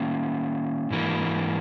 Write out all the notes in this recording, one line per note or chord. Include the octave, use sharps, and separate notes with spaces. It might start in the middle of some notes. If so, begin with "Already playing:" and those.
Already playing: D#3 A#3 C#4
G#2 E3 A#3